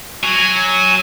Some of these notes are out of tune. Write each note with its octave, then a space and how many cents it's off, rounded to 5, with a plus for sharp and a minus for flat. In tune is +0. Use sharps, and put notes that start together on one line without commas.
F#3 +0 G#5 +0